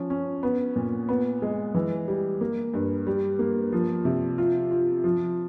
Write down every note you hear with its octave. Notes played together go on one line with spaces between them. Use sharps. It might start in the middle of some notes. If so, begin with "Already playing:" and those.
Already playing: F3 C#4
C#4
B3
A#2
B3
G#3
E3
G3
A#3
G2
G3
A#3
F3
C3
F4
F4
F3